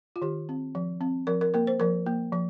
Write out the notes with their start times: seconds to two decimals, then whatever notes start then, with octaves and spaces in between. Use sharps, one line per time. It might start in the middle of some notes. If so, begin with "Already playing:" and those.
0.16 F4
0.22 D#3 G4
0.49 C4
0.75 F3
1.01 C4
1.27 F3 A#4
1.41 A#4
1.54 A#3 A#4
1.67 C5
1.80 F3 A#4
2.06 A#3
2.33 F3